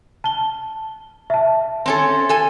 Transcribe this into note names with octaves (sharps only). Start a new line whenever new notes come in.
A5 G7
E5 A5
C4 C#4 A4
A4 G#5